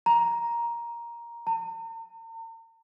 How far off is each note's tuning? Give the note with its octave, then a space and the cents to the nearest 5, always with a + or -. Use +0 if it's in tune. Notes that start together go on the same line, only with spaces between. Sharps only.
A#5 +10
A#5 -45